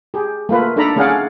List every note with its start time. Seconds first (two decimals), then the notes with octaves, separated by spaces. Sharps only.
0.14 G4 G#4
0.49 A3 A#3 F4 B4
0.76 D4 D#4 A4 D5 A#5 B5
0.96 A3 C#4 G#4 D5 F5 F#5